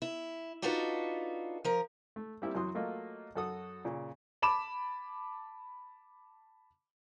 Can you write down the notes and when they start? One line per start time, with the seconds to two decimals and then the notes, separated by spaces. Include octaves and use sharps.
0.02 E4
0.62 D4 D#4 F4 F#4 A4 B4
1.65 F3 A#4
2.16 A3
2.42 G3 A#3 C4 E4 G4 E5
2.55 F#2 E3 F#3 F#4 C6 D#6
2.75 F#3 A3 A#3 F4 D#5
3.35 F#2 F#4 A4 F#5 D#6
3.85 A#2 C#3
4.42 A5 B5 D6 E7